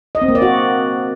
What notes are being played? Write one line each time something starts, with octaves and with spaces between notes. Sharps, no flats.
D#5
C4
A#3
D5
F#4